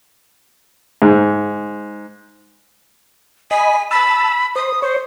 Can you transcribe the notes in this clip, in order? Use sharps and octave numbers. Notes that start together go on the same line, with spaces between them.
G#2
D#5 G#5 B5
A5 B5 E6
C5 D#6
C5 C#5